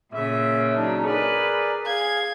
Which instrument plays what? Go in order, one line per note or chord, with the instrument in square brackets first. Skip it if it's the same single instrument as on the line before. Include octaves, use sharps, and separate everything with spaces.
[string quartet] A#2 C#3 [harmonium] E5
[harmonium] F#3 D4 D#4
[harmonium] G#4 A#4 D5 [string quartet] B4
[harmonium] G#4 F5 [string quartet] G#6